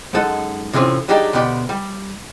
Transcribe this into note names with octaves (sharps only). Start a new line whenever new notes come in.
F#2 G#3 D#4 A4 F#5
A2 C3 E3 C4 C#4 F4
F#3 G3 D4 D#4 G4 G#4
D2 B2 B3 G4 D5
G3